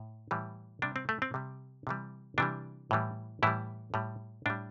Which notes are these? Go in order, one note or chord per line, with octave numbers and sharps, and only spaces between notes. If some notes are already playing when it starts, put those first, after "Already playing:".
Already playing: A2
A2 E3 G3
C3 G3 D4
C4
A3
C4
C3 G3
C3 E3 G3
C3 E3 G3 D4
A2 E3 G3
A2 E3 G3 E4
A2 G3
A2 G3 D4